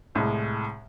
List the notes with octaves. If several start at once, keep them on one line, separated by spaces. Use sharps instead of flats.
C2 A2 G#3